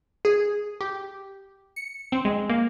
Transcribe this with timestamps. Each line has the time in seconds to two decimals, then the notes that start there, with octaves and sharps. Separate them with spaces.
0.25 G#4
0.81 G4
1.76 C#7
2.12 C4
2.25 G#3
2.49 A#3